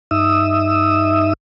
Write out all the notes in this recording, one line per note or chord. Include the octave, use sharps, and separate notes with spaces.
G2 D#4 E5 D#6 E6